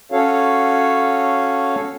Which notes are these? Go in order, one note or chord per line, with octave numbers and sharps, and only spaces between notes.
C#4 F#4 A4 C#5 F5